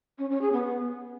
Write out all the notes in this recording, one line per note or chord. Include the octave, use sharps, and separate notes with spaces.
C#4
C#4
G#4
B3